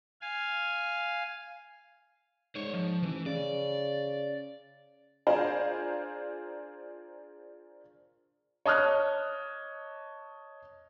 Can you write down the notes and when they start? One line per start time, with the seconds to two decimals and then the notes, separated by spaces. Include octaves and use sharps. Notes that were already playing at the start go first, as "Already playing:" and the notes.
0.21 F5 G#5
2.55 G#2 C5 C#5
2.74 F3
3.03 A1 E3
3.26 C#3 D5
5.27 D4 F4 G#4 A#4 C5
8.66 C#5 D#5 A5 D#6 F6 F#6